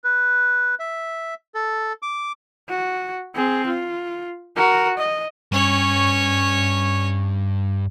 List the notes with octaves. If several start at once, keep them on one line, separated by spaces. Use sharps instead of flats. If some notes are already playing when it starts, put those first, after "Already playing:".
B4
E5
A4
D6
F#4
C4 G#4
F4
F#4 A#4
D#5
G2 C#4 C#5